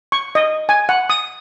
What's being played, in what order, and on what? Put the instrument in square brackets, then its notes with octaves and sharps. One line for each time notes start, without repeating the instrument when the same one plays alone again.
[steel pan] C#6
D#5
G#5
F#5
D#6